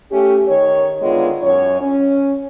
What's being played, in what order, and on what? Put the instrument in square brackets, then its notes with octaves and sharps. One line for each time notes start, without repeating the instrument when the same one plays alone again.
[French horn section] A3 C#4 G4
D#3 C#5
D3 D#3 G#3 B3 F4
F#2 C#5
C#4